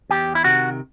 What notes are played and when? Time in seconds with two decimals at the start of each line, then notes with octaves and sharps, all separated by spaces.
0.10 E2 G4
0.35 E4
0.44 C3 D#3 F#4